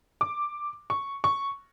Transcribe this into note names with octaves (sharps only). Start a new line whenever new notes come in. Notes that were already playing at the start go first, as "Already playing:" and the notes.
D6
C#6
C#6